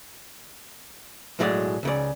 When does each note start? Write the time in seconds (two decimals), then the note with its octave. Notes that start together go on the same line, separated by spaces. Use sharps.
1.39 B1 A2 F#3 G#3 A4 D5
1.83 C#2 C#3 D5